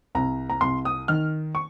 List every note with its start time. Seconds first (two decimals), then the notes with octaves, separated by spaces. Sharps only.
0.15 C2 A#5
0.50 A#5
0.61 C2 C6
0.85 D#6
1.08 D#3 F6
1.55 C#6